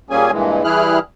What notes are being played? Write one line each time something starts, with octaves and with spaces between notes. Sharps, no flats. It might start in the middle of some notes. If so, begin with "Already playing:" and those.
A#2 G3 A#3 C#4 G#4 G#5
G2 A#2 E3 G#3
E3 G3 E4 G#4 F6 F#6